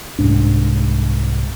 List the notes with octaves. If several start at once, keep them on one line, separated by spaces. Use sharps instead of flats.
C2 G#2 D4